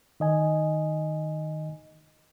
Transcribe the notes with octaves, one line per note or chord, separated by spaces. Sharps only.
D#3 D#5 G#5